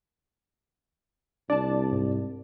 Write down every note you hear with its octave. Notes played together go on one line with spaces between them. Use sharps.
C2 D4 D5 A5
G#2